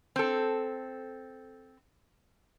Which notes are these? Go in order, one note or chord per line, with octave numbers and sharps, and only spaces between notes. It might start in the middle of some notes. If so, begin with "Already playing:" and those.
C4 A4